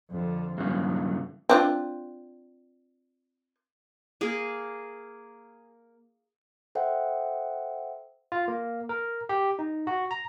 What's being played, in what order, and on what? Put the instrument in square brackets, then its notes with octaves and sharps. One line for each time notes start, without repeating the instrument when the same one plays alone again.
[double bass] F2 D3
[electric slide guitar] G2 C#3 [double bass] F#3
[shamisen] C4 D4 F4
[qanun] A#3 G#4
[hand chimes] A4 C5 E5 F#5 G5
[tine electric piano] F4
A#3
A#4
G4
D#4
F#4
A#5